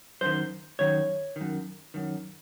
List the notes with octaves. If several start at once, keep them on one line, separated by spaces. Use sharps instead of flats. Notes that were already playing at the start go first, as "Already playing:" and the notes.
F#2 D#3 C5
F#2 D#3 C#5
F#2 D#3
F#2 D#3